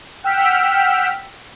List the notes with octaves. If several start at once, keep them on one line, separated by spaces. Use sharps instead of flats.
F#5 G5 E6 F6 B6